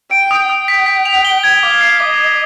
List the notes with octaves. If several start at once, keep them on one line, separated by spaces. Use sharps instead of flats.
G5 D7
D#6
G5 D#6
B6
B6
F7
G7
G#6
F5 D6
C7
D#5 D6
C7